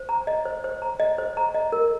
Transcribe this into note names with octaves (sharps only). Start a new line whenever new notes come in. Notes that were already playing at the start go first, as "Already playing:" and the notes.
Already playing: C5
A#5
D#5
C5
C5
A#5
D#5
C5
A#5
D#5
A#4